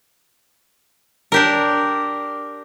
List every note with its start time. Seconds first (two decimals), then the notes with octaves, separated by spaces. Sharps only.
1.32 D4 G4 A#4